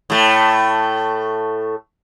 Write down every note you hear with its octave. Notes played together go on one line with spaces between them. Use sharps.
A2 A3